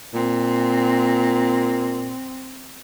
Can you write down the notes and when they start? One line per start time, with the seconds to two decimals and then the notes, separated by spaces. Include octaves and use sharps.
0.14 A#2 C4